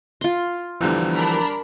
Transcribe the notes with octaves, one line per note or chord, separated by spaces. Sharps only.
F4 C6
A#1 E2 D3 E3 F3 G3
D4 A#4 B5